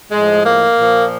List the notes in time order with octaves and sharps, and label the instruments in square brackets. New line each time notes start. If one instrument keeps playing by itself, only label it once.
[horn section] A2 F3 G#3
A#3
A#2 F3